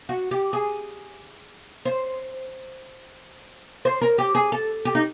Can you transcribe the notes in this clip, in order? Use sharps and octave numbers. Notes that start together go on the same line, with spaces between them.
F#4
G4
G#4
C5
C5
A#4
G4
G#4
A4
G4
D#4